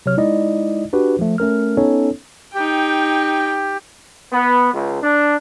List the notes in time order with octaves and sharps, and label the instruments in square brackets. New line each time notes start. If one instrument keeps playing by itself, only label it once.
[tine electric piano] C3 F#3 C#5 F6
G#3 D#4 E4 D5 D#5
D4 F#4 G4 B4
F3 A3
A3 C#4 A#4 F6
B3 C#4 D#4 A4 C#5
[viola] D#4 G5 [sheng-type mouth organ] G4
[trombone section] B3
C#2
D4